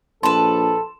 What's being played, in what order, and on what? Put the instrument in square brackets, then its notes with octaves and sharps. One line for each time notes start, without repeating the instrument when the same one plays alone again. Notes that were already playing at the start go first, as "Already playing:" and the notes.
[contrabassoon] A#1 [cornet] A4 [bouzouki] B4 A5 [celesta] C6 E7